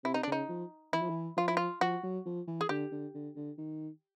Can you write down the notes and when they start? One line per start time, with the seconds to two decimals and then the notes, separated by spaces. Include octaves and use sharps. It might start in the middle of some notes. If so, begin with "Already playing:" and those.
0.04 C3 E4
0.14 D#4
0.23 D4
0.27 C#3 D#4
0.49 F3
0.93 E3 E4
1.02 F3
1.09 E3
1.37 F3 F4
1.48 E4
1.57 F4
1.81 F3 F#4
2.04 F#3
2.26 F3
2.48 E3
2.61 G#4
2.69 D3 G4
2.92 D3
3.14 D3
3.36 D3
3.58 D#3